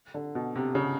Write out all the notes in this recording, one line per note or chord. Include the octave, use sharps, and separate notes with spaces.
D3
B2
C3
C#3